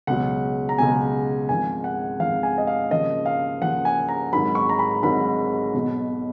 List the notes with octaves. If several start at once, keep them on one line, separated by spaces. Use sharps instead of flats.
C#2 B2 F#3 F#5
A#5
C#2 B2 F#3 G#5
G#1 G#2 F3 G#5
F#5
G#1 G#2 F3 F5
G#5
D#5
F5
D#2 C#3 F3 D#5
F5
D#2 C#3 F3 F#5
G#5
A#5
G#1 G#2 D#3 F#3 B5
C#6
A#5
B5
G#1 G#2 D#3 F#3 B5
B1 B2 F#3